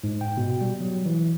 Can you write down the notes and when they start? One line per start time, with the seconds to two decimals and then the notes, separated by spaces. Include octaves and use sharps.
0.04 G#2
0.21 G5
0.37 B2
0.61 G3
0.80 F#3
1.06 E3